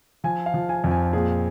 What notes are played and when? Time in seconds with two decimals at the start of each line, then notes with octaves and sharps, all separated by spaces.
0.24 F3 G#5
0.46 F5
0.54 F3
0.69 G#5
0.84 F2
0.91 G#5
1.13 A#2 G#4